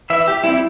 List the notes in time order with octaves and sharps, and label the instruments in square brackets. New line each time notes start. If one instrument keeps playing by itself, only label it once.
[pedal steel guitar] E3 E5
G4
G3 C4 E4